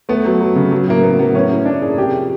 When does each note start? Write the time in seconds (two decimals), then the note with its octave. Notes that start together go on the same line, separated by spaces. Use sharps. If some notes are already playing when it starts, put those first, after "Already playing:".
0.09 A3 B3
0.25 F#3
0.41 F#3
0.56 C#3
0.71 F#3
0.88 A2 A#3
1.03 A#3 B3
1.19 F#3 B3
1.34 A2 C#4
1.50 A2
1.65 A2 D4
1.82 A#3 G#4
1.98 C3 G4
2.13 F3